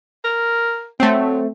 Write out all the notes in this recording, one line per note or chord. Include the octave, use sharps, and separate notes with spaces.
A#4
F#3 A3 C4